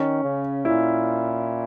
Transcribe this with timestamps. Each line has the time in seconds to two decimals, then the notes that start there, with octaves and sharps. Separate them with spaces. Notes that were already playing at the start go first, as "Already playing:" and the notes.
Already playing: D#3 C#4
0.24 C#3
0.65 A#2 E4